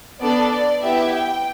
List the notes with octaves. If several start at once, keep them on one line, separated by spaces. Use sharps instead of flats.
B3 D4 A4 D5
D5
B3 E4 G4 E5
G5